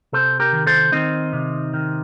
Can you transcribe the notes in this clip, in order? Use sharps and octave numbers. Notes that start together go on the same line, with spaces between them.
C3 A4 C5
G4 A#4
D#3
A4 C5
D#3 C4 D#4
C3
D#3